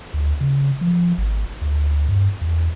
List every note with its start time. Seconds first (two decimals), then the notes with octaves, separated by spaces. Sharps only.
0.14 D2
0.41 C#3
0.81 F3
1.18 G#1
1.61 D2
2.08 G2
2.41 E2